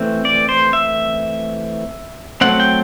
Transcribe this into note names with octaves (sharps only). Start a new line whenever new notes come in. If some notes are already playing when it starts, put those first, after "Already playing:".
Already playing: E3 A3 C4
D5
C5
E5
F#3 A3 C4 F#5
G5